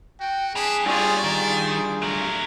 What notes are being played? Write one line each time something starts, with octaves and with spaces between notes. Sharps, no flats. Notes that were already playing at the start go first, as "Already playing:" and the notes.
F#4 G5
F2 D4 G#4 B4
G2 G3 C4 F4 G#4 C#5 D5
D#3 G#4
F#3 A3 A#4